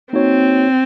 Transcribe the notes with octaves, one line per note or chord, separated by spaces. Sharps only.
A#3 C4 D#4 F#4 C#5